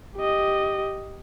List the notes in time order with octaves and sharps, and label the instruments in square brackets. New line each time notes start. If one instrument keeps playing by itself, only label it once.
[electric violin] G4 D#5